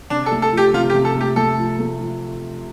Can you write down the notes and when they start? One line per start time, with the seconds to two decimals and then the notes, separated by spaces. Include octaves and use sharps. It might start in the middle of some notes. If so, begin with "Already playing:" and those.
0.10 C3 D4
0.26 A4
0.32 A3
0.42 A4
0.52 F3 G4
0.74 C3 F4
0.90 G4
0.94 C3
1.05 A4
1.16 A3 G4
1.36 A3 A4
1.58 F3
1.79 A3
2.00 F3